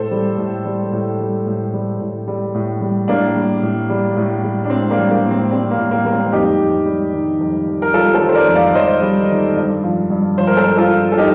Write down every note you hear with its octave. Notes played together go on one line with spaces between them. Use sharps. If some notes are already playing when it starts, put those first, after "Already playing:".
Already playing: A2 A4 C5
G3
A2
G3
A2
G3
A2
G3
A2
G3
A2
G3
A2 A#3 D4
G3
A2
G3
A2
G3
D4
A2 C4
A#3 D4
G3
A#3
A2
C4
G3 C4
A#3
A2
A#3
G3 A#3
C4
F2 D#4 G4
F2
G3
D#3
F2
F2
A#4
G3 F4 A4
A4 C5
D#3
C5
A#4 D5
F2
D5 F5
F2 C5 D#5
G3
D#3
G2
F3
G2
F3 C5
A#4
A4 C5
G2
F4 A4
F3
A4
D#4 G4